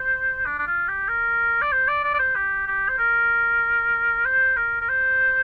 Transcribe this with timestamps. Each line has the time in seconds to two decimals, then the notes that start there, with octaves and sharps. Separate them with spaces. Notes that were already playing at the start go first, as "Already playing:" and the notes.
Already playing: C5
0.46 D4
0.59 D4
0.66 F4
0.88 G4
1.09 A#4
1.61 D5
1.72 C5
1.88 D5
2.04 D5
2.14 D5
2.19 C5
2.35 G4
2.67 G4
2.89 C5
2.98 A#4
4.25 C5
4.56 A#4
4.81 A#4
4.89 C5